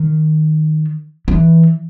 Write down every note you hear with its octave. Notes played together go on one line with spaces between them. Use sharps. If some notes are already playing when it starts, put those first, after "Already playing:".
Already playing: D#3
E3